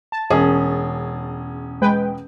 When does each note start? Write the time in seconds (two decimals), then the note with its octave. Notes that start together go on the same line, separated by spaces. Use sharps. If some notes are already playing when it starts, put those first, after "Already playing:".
0.12 A5
0.30 E1 C#4 G#4
1.82 G#3 B4 G5